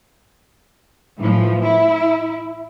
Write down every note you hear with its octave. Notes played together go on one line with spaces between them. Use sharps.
A2 E3 F3
E4